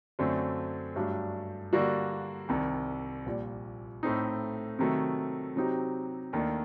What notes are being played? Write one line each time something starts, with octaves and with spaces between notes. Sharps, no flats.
F#2 D3 A3 C4
G2 F#3 A3 D4 G4
D3 G3 A#3 F#4
C2 C3 D#3
A#1 A#2 G3
A2 A3 C4 D#4
C3 D#3 F#3 A3
C3 F#3 C4 D#4 G4
D#2 D#3 A3 D4